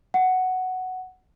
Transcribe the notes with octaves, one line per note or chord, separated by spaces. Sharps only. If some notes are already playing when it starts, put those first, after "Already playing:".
F#5